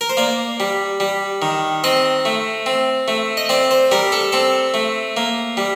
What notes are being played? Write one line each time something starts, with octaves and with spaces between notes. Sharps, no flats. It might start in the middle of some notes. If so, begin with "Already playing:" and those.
A#4
C5
A#3 D5
G3
G3
D#3
C4 D#5
A3
C4
A3
D#5
C4 D5
C5
G3 A#4
A4
C4 A4
A3
A#3
G3